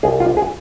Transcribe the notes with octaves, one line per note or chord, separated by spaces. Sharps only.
C2 G#4
F4
G#4